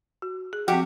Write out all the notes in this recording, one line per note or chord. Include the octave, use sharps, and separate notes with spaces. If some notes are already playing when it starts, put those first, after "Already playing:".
F#4
G#4
F3 C4 F#4 G4